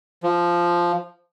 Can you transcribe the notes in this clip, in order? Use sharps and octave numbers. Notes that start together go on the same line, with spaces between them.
F3